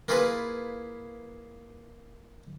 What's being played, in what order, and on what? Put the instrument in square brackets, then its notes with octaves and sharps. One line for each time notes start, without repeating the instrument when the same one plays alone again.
[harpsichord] A#3 E4 F4 G#4 B4